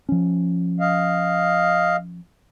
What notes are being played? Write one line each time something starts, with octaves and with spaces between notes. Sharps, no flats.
F3 C#4
D#5 F5